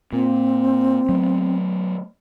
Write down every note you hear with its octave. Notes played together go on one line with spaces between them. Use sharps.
A#2 C4
F#3 A3 B3